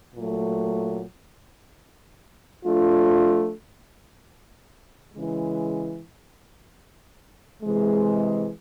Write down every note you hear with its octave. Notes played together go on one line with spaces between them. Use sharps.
A#2 F#3 A3
F3 A3 D4 F4
C#3 E3 G#3
C3 E3 G#3